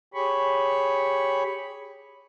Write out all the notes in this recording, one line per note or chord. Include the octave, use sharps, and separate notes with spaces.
G4 G#4 C#5 B5 C#6